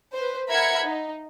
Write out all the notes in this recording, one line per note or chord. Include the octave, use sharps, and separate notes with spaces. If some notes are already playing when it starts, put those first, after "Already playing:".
B4 C5
A#4 E5 F#5 B5 G#6 C#7
D#4